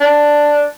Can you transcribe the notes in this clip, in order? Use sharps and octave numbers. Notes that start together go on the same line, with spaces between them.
D4